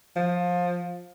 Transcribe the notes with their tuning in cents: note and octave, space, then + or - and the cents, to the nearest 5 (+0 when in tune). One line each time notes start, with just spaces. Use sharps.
F3 +20